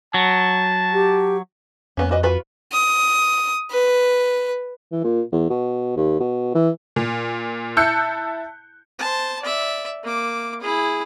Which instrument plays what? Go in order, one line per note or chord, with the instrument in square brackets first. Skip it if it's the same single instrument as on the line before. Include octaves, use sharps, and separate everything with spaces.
[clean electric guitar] F#3 [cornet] A5
[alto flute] G4
[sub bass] F2 [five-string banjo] A#3 B3 C#4
[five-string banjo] F#4 B4 D#5
F4 F#4 B4
[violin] D#6
B4
[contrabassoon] E3
A#2
E2
B2
D#2
B2
E3
[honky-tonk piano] A#2
E4 A5 E6 F#6 G6 C#7
[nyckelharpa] C5 A5
D5 E5
A#3 D6
E4 G#4